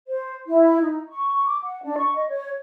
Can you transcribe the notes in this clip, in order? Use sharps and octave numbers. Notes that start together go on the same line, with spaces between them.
C5
E4
D#4
C#6
D6
F#5
D4
C#6
D#5
C#5